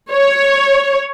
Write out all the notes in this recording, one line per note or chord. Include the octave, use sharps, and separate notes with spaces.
C#5